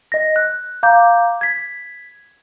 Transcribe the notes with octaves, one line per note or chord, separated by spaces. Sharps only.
D#5 A#6
F#6
F5 A#5 D6 G6
G#6 B6